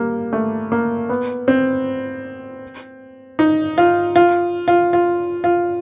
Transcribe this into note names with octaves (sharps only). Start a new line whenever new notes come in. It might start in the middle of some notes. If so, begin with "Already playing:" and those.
Already playing: G3 A#3
A3
A#3
B3
C4
D#4
F4
F4
F4
F4
F4